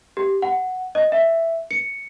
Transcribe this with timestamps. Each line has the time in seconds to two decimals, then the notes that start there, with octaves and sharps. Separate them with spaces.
0.17 G4
0.42 F#5
0.95 D#5
1.12 E5
1.71 C#7